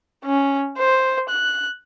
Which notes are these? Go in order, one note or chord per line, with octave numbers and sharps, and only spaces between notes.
C#4
C5
F#6